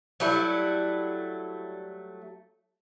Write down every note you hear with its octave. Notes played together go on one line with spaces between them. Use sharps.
F#3 G3 A3 E4